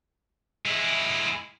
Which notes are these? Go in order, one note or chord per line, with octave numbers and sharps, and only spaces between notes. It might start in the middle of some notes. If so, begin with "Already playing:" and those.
G#3 E4